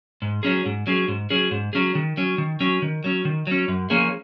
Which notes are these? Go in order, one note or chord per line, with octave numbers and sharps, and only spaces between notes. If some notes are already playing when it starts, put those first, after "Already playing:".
G#2
F#3 C#4 G#4
G#2
F#3 C#4 G#4
G#2
F#3 C#4 G#4
G#2
F#3 C#4 G#4
D#3
F#3 C#4
D#3
F#3 C#4
D#3
F#3 C#4
D#3
F#3 C#4
F#2
F3 A#3 C#4 G#4